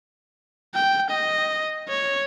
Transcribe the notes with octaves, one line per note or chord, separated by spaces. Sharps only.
G5
D#5
C#5